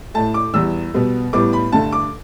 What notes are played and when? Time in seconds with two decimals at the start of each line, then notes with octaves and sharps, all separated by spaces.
0.14 A2 A3 A5
0.34 D6
0.54 E2 E3 G3 E6
0.94 B2 G3 B3
1.33 A2 G3 B3 D6
1.53 B5
1.72 G2 D3 A3 A5
1.92 D6